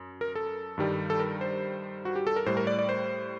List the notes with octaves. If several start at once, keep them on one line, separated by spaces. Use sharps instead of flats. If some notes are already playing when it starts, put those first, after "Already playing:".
Already playing: F#2
A#4
A4
G2 D#3 G3
A4
A#4
C5
F#4
G4
A4
A#4
A2 G3 C5
A#4
D5
D5
C5